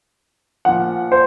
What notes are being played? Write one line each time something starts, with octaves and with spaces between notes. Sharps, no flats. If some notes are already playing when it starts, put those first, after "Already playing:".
A#2 F3 F#5
C5